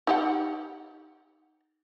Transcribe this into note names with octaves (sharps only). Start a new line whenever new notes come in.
D#4 G4 F#5